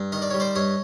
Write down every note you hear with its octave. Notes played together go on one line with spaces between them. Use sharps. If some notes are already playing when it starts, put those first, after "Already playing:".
Already playing: G2
D#3 D#5
D5
G3 C#5
C5 D5
G2 C#5 D#5